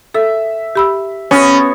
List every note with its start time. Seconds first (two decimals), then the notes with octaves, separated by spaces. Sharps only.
0.14 A4 E5
0.76 G4 B5 E6
1.31 B3 C#4 F#4 B4